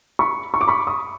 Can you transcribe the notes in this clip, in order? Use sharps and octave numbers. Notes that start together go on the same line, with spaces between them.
B5 C#6
C#6
D6
B5 C#6
C#6 D#6